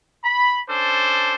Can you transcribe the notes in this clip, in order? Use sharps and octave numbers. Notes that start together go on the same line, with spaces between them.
B5
C#4 D4 A4 C5